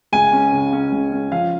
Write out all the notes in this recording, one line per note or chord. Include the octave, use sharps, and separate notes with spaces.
C#2 G#5
C#4
C#3
C#4
C#2
C#4
F3 F5